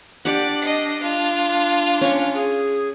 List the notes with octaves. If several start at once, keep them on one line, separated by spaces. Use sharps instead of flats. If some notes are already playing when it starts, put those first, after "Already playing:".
D4 G4 D5 F#5
D#5 C7
F4
C#4 C#5
G#4